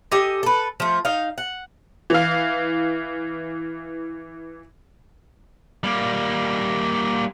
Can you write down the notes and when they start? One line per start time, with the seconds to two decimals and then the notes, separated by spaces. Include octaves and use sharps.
0.12 G4 A4 D#5 G#5
0.43 A4 B4
0.80 F3 A3
1.05 D#4 F5
1.38 F#5
2.10 E3 F5
5.84 G3 A#3